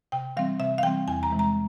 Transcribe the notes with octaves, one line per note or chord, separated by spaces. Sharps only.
C3 G5
E3 G3 C4 F5
C3 E5
F5
E3 G3 C4 G5
E2 G#5
A#5
C3 E3 G#3
A#5